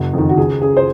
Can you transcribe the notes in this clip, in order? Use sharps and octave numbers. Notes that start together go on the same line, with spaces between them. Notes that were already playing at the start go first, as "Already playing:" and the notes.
Already playing: F#1 F#4
F2 D#3
F#4
C#2 G#4
C#3 G#4
C5